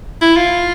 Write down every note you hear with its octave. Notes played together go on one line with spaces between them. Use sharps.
E4
F4